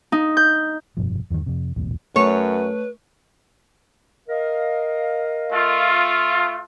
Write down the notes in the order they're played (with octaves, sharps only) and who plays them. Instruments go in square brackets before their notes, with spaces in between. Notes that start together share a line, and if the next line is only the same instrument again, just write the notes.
[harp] D#4
G6
[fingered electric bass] F1 G2 B2 F3
E2 G2 D3 D#3
F2 C3
D#1 B1 E2 A2
[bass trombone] F#2 [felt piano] A3 [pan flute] B4 [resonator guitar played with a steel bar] C#5
[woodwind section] A#4 D#5 F5
[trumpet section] A3 F4